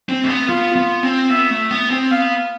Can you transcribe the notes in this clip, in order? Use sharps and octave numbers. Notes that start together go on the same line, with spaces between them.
C4
A3
B3
B3 F4
B3
C4
B3 E5
A3
B3
C4
B3 F5